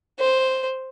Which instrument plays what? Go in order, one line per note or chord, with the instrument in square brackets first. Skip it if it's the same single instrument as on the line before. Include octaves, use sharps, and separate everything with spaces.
[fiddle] C5